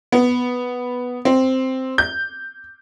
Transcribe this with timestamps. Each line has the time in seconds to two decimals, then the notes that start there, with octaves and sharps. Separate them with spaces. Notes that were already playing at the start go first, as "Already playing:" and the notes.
0.12 B3
1.25 C4
1.98 G6